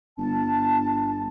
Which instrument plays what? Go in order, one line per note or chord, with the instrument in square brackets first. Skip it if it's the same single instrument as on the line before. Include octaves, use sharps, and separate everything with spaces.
[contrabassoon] G1 [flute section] A5